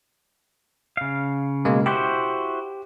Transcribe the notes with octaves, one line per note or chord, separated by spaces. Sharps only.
C#3 F5
B2 G#3 A#3
E4 F#4 G4 C5